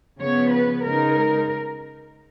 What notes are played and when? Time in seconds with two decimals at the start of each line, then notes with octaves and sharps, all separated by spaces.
0.20 C#3 F3 B3 C#5
0.52 B4
0.84 C#3 G#3 D#4 A#4